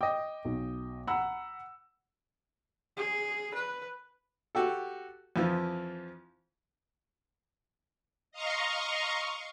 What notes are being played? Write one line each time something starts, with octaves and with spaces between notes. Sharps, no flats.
D#5 G5 D6
B1
F#5 A#5 B5 E6
G#4
B4
F#4 G4 A4
F2 E3 F3
D#5 F5 A#5 C6 C#6